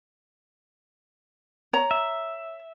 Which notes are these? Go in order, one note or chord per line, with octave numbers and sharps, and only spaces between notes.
C#5 A#5
E5